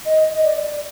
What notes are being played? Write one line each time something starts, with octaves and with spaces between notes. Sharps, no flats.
D#5
D#5
D5